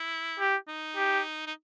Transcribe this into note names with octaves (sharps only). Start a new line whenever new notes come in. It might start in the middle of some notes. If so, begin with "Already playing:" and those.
Already playing: E4
G4
D#4
G4
D#4